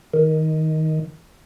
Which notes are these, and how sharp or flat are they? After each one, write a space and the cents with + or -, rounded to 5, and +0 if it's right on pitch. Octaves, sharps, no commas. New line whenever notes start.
D#3 +15